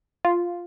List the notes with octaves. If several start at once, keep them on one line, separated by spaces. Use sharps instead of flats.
F4